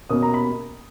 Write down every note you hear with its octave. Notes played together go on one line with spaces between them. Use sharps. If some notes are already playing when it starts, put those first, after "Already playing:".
B2 A#3 C#4 D#6
A#5
B5